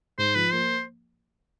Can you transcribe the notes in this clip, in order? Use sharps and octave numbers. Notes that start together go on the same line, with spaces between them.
G#2 C5
F3 B4
A#3 C5